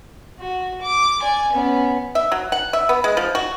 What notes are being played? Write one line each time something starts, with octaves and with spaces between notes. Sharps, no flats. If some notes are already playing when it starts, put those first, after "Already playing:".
F#4
D6
D5 G#5
B3 C#4
E5
F#3
F#5
E5
B3
G#3
F3
F#4